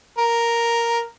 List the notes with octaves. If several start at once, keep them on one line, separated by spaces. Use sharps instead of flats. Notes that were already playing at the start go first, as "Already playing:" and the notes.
A#4